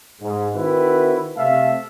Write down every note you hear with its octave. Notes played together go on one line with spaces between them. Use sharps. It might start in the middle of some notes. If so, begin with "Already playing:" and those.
G#2
D#3 C4 E4 F#4 B4
C3 A3 E5 F5 A5